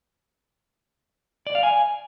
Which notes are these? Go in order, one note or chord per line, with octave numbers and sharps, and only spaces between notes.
D5
F5
G#5